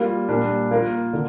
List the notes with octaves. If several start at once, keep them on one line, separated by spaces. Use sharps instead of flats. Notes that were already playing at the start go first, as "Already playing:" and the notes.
Already playing: G3 A#3 F4
A#2 G3 D4 A#4
A#3 F4 A#4
D3